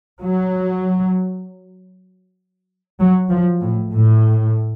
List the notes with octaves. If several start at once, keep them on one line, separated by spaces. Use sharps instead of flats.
F#3
F#3
F3
A2
A2